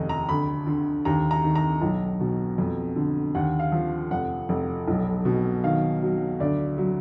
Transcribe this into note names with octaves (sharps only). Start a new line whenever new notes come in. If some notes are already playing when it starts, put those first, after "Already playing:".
Already playing: F1 D#2 D#5
A#5
D2 B5
D3
D#2 A#5
A#5
D#3
A#5
B1
B2
F2
D3
D#2 F#5
F5
F3
F1 F#5
F1
B1
B2
D#3 F5
F#3
D2 D5
F#3